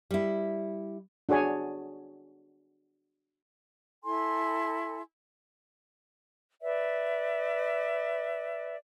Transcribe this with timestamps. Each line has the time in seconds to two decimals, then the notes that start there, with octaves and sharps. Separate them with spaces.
0.11 G3 E4
1.29 D4 F#4 G#4 C#5 G#5
4.04 E4 A4 G#5 C6
6.61 B4 D5 E5